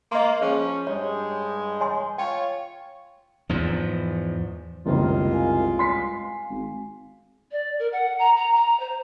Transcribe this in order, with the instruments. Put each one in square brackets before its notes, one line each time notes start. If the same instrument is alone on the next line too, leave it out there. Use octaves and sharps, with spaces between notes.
[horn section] A#3 [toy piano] D#5 C6
[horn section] F3 C#4 [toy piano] G#4 C5
[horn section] G2 G#3 [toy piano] C#5
[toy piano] C#5 G#5 C6
[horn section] F4 C#5 [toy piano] G5
[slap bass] E2 G#2 F3
[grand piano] F#1 D#3 A#3 [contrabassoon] C2 [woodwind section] G#3 F4
[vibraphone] F5 G#5
[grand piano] C6 B6 C7
[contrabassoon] G#1
[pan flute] D5
A#4
F#5
A#5
A#5
A#5
C5